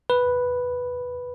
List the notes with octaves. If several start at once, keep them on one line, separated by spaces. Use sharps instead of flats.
B4